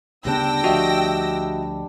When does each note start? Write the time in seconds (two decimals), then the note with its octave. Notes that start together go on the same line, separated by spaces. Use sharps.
0.25 D2 C#3 G3 B3 D4 G5 E6 A#6
0.64 D2 F3 F#4 D#5 E5